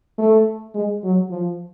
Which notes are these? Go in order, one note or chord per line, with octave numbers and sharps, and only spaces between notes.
A3
G#3
F#3
F3